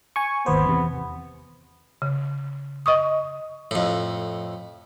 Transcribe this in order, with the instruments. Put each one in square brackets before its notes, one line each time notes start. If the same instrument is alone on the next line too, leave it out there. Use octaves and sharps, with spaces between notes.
[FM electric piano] G#5 C#6
[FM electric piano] G#1 D#2 C5 [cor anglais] B3
[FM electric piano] E2 C3
[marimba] C#3
D#5 C#6 D#6
[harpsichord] F2 A2